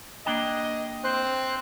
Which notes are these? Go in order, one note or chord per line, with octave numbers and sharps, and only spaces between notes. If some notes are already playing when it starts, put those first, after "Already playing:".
A#3 D4 D#5 G5
C4 C5 F#6